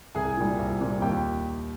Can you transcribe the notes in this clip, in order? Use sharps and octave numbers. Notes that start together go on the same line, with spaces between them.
C2 G#4 G#5
A#2 G3
C2
A#2 G3
D#2 G4 G5